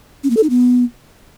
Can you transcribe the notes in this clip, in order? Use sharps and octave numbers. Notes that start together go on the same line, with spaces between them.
C#4
A#3
A4
D#4
B3